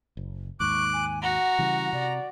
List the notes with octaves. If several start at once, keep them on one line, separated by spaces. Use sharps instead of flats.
F#1
D#2 G#2 C#6 D6 F#6
G#5
F#4 F#5 A#5
C#3 E3 G3
C3 D5